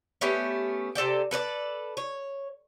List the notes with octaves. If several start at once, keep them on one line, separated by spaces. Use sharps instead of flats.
A3 B3 C#4 G4
C3 A4 D5 G5
A4 B4 C#5 D5
C#5